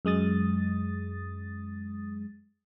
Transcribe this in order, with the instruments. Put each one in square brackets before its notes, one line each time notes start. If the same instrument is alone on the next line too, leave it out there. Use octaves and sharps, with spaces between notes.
[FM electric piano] F#2 G#3 D#6 A6